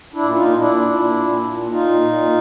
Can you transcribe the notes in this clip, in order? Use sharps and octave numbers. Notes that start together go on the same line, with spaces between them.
D4 E4
A#2
E4
D#4 F4
A#2
D4 E4
A#2
A#2
A#2
A#2 D#4 F4
A#2